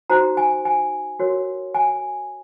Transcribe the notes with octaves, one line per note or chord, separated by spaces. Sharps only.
D#4 F#4 C5 A#5
G#5
G#5
F#4 A#4 C#5
G#5